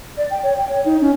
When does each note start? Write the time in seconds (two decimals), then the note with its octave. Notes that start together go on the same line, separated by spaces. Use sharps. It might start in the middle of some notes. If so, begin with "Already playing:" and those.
0.17 D5
0.30 G5
0.43 C#5
0.57 G5
0.69 C#5
0.85 D#4
1.01 C#4